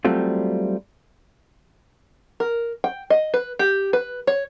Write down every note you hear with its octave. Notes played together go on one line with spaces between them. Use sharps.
F#3 G3 A3 C4 F4
A#4
G5
D#5
B4
G4
B4
C#5